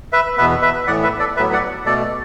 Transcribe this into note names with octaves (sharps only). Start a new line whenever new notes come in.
B4 E5
E2 B2 B3 B4 E5
B4 E5
A2 E3 B3 D5 F#5
B4 E5
A4 D5
A2 F#3 B3 B4 E5
D5 F#5
B2 A3 A4 D5